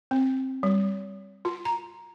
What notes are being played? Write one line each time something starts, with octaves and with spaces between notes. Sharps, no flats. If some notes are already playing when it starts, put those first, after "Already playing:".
C4
G3
F4
A#5